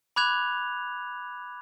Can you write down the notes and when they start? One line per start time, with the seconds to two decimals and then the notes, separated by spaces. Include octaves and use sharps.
0.16 B5 D6 F#6 G#6 F7